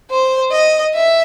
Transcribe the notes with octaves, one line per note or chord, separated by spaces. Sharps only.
C5
D#5
E5